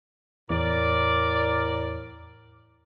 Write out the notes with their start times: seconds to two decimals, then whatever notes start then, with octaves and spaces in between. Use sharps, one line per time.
0.50 E2 A2 A#4 D5